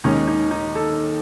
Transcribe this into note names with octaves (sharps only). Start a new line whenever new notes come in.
D#2 D#3 G#3 C#4 D#4
D#4
D#4
A4